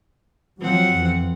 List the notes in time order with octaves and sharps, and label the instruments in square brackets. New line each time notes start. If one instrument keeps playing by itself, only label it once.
[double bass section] F3 F#3 [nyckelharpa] C4 F#5
[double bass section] F2 E3